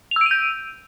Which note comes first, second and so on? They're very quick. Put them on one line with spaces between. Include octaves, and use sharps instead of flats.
F7 E6 D7 D#7 G6